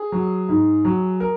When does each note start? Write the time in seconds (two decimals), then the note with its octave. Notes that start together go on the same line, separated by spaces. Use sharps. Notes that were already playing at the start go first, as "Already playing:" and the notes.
Already playing: G#4
0.12 F#3
0.49 G#2
0.85 F#3
1.20 A#4